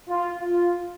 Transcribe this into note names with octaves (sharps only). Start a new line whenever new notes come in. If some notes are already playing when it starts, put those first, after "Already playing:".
F4
F4